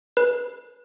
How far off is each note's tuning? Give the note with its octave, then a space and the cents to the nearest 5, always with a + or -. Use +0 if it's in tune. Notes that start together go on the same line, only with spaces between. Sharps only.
B4 -20